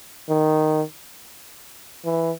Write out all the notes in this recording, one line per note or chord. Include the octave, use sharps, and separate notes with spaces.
D#3
E3